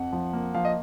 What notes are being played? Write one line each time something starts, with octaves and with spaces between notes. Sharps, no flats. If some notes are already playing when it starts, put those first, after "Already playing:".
Already playing: F2 F#5
F3
A#3
F3 F5
D#5